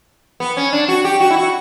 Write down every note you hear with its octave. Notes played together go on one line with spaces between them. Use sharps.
B3
C#4
D4
F#4
G4
F#4
E4
F#4